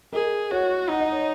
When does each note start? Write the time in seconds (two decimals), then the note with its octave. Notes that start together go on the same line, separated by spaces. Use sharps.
0.13 G#4 A#4 D#5
0.51 F#4 C#5 F#5
0.90 D#4 F#5
1.00 D#5
1.12 C#5